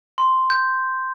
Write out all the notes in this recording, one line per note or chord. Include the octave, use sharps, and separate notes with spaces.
C6
G6